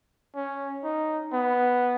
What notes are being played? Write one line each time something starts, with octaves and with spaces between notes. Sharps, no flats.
C#4
D#4
B3